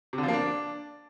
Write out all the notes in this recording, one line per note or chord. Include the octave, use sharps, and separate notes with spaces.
C3
D3
F3
A#3
D4